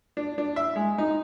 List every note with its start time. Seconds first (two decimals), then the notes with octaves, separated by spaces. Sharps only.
0.17 D4
0.38 D4
0.56 E5
0.76 G#3
0.98 D#4